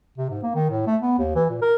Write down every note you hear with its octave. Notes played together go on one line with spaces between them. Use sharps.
C3
G#2
A#3
D#3
A2
A3
B3
D#2
E3
A#2
A#4